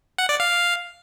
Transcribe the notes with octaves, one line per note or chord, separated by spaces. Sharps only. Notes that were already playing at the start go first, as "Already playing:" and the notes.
F#5
D5
F5